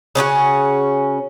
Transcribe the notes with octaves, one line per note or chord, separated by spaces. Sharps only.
C#3 C#4 D4 F#4